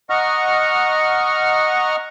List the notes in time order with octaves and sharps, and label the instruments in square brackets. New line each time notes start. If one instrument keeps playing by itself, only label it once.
[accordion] D#5 F#5 A#5 C#6 F6